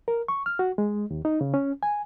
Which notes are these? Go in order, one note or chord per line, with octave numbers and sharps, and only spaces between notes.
A#4
C#6
F6
F#4
G#3
D#2
D#4
C#3
C#4
G#5